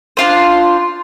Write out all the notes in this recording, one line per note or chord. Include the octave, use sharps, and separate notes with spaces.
D4 F4 C5